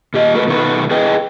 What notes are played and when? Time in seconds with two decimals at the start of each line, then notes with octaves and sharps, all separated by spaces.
0.14 A#2 G4 D#5
0.35 A3 F#4 A#4 B4
0.48 B2 D#3 A3 B3 F#4 B4
0.91 G#4 B4 D#5 G5